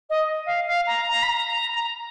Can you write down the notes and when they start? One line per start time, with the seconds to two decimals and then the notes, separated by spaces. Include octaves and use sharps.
0.09 D#5
0.45 F5
0.66 F5
0.86 A#5
1.08 A#5
1.22 B5
1.29 A#5